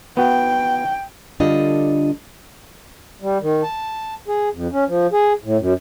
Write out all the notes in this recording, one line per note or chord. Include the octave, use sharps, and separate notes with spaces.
B3 F#4 G5
D3 G3 D4 F4 A4 D#5
G3
D#3
A5
G#4
F2
C#4
F3
G#4
A2
F#2